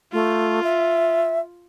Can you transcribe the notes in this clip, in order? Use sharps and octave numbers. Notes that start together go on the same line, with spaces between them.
A3 F4
E5